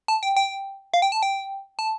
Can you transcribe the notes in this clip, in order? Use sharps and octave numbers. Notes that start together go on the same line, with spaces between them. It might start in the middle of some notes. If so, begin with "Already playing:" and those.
A5
G5
G5
F5
G5
A5
G5
A5